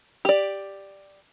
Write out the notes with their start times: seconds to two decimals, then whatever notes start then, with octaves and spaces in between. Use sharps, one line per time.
0.25 G4 D5